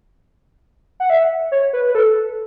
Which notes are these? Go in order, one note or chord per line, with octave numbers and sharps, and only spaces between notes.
F#5
E5
C#5
B4
B4
A4